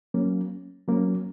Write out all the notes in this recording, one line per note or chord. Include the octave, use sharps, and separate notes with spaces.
F#3 A#3 C#4
F#3 A#3 C#4